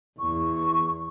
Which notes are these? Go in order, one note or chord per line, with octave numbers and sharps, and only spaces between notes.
E2 C#6